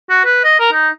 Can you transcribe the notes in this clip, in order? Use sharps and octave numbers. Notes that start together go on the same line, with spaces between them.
F#4
B4
D#5
A#4
D#4